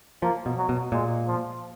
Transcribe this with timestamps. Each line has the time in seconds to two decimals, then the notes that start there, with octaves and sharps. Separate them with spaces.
0.22 F3 A#3
0.46 B2
0.57 F#3
0.69 B2
0.92 A#2 G#3
1.27 F3